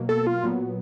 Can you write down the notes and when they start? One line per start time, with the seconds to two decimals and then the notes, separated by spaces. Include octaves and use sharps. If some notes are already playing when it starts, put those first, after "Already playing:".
Already playing: B2 F#3 A#3
0.09 A4
0.27 F4
0.44 A#2 F#3 B3